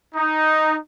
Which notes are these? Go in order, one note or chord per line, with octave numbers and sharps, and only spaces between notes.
D#4